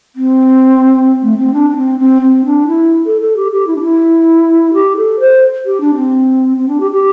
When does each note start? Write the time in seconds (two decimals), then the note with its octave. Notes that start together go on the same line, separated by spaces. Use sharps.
0.16 C4
1.23 A3
1.38 C4
1.53 D4
1.70 D4
1.76 C4
1.99 C4
2.22 C4
2.45 D4
2.67 E4
3.06 A4
3.21 A4
3.37 G4
3.52 G4
3.67 E4
3.76 D4
3.82 E4
4.74 G4
4.97 A4
5.20 C5
5.65 G4
5.81 D4
5.95 C4
6.57 C4
6.68 D4
6.80 G4
6.91 G4